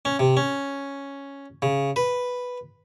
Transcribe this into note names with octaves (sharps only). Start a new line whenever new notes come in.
C#4
C3
C#4
C#3
B4